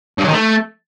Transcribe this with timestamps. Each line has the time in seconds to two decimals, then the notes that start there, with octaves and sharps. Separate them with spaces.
0.18 G2
0.24 F#3
0.29 D#3
0.34 A3